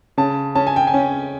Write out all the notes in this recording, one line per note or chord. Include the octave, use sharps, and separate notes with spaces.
C#3 A5
C#4 A5
G#5
G5
G#5
C#4